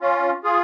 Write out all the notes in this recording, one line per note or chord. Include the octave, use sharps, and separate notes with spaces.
C#4 F4
F4 G#4